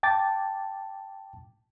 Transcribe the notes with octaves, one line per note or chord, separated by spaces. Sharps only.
G5 A5 D6 A6